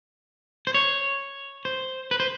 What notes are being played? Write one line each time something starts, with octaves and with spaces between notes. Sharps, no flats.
C5
C#5
C5
B4
C5